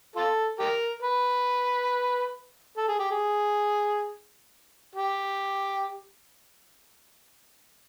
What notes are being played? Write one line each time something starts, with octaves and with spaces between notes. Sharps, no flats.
F4 A4
G4 A#4
B4
A4
G#4
G4
G#4
G4